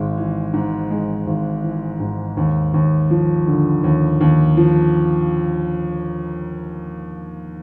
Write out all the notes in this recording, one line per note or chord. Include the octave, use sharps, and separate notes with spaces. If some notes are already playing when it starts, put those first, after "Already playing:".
Already playing: G#1 G#3
E3
G#2
G#3
G#1
E3
G#2
D#2
D#2
F3
D3
D#2
D#2
F3